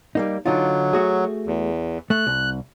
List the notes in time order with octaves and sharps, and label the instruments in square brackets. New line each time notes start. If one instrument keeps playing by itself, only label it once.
[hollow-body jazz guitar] G3 A#3 D#4
[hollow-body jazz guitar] D3 D#4 F4 [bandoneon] F#3
[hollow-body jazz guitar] A3 F#4 G#4
[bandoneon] E2
[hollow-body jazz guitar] A3 [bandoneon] F#6
[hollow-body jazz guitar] C2